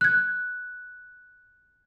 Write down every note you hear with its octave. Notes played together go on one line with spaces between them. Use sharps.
F#6 G#6